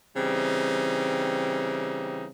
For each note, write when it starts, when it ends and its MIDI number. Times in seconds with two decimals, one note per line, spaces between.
0.16 2.28 49
0.16 2.28 52
0.16 2.28 55
0.16 2.28 60
0.16 2.28 63